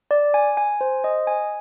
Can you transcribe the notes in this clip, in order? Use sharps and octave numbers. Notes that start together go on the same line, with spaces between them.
D5
G#5
G#5
C5
D#5
G#5